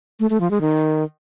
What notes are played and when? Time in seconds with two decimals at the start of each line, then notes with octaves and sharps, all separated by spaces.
0.20 A3
0.30 A3
0.40 F3
0.51 G#3
0.61 D#3